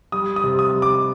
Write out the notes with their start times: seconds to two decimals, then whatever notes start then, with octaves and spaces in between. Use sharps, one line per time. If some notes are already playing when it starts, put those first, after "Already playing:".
0.12 G3 D#6
0.36 D#6
0.44 C3
0.59 D#6
0.75 G3
0.82 D6